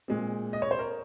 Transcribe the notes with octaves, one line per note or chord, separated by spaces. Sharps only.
A#2 G#3 C4
D#5
C#5
C5
A#4